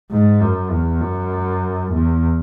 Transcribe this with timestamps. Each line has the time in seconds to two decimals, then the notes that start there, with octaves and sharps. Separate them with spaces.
0.11 G#2
0.41 F#2
0.71 E2
1.01 F#2
1.93 E2